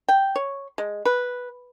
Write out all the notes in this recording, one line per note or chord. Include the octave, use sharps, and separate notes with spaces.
G5
C#5
G#3
B4